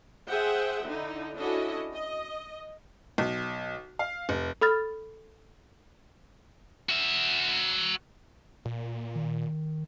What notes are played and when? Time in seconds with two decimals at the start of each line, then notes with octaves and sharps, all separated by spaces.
0.29 G#4 C5 E5 F#5 G5
0.85 D3 D#4 E4
1.39 C#4 D4 E4 F#4 A4 D#5
1.94 D#5
3.18 B1
3.99 F5
4.29 F1
4.61 A4 B5 F6 A6
6.89 F#4 E5
8.65 A#2
9.15 D#3